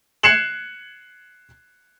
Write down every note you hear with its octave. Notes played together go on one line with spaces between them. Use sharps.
F#6 G#6 C7 C#7 E7 F#7